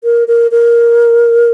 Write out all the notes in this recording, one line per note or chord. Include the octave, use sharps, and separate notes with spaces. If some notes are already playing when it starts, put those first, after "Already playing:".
A#4
A#4
A#4